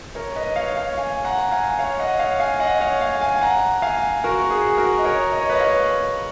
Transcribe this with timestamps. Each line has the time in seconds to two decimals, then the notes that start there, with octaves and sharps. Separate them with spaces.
0.15 A#4 C#5
0.36 B4 D#5
0.56 C#5 F5
0.77 C#5 F5
0.97 F5 G#5
1.25 F#5 A#5
1.40 A#5
1.51 F5 G#5
1.79 C#5 F5
1.99 D#5 F#5
2.19 C#5 F5
2.40 F5 G#5
2.60 D#5 F#5
2.80 C#5 F5
3.01 F5 G#5
3.21 F5 G#5
3.36 G#5
3.42 F#5 A#5
3.82 F5 G#5
4.24 F#4 A#4
4.50 G#4
4.78 F#4 A#4
4.99 D#5
5.05 A#4 C#5
5.32 D#5
5.41 C#5
5.49 B4 D#5
5.59 C#5 F5